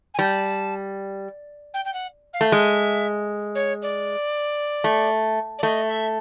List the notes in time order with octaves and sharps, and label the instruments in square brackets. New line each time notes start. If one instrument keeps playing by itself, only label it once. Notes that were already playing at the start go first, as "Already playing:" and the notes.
[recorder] G#5
[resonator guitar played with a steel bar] G3 [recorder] A5
[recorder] G5
G5
F#5
F5
[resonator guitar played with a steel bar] A3
[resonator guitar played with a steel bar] G#3 [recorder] E5
[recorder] C#5
D5
[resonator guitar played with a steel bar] A3
[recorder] D5
[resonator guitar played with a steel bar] A3 [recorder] D#5
[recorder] E5